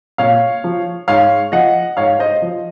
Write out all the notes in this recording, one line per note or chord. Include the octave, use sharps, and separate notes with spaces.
A#2 C#5 F5
F3
G#2 C#5 F5
F3 D#5 F#5
G#2 C#5 F5
C5 D#5
F3